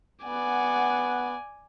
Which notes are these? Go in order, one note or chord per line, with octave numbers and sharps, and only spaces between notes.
B3 D5 F#5 G#5